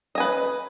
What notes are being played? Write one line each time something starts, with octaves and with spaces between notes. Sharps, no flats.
B4 D#5 G#5